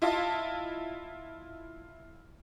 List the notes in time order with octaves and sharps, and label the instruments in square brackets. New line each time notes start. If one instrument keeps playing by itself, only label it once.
[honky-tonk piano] E4 F4 D#5 A5